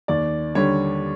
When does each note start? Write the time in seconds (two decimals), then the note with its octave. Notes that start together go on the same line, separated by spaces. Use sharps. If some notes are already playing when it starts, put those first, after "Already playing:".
0.08 D#2 D5
0.55 D3 G3 C#5